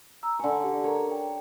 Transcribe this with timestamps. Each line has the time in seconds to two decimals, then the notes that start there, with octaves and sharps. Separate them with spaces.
0.23 A#5 E6
0.39 D3 G#5 C#6
0.64 G4
0.84 A4 A#4 C#5 A#5
1.11 G5